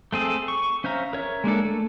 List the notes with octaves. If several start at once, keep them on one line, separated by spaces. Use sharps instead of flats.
A3 C4 G#4 A4
C#6
C#4 C5 E5 F5 A#5
A#4 C#5 E5
G#3 A#3 D4 A4
A3